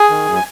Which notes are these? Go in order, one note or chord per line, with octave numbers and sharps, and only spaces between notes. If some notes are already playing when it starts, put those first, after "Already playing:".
Already playing: G#4 G#5
D#3
F#2
G#5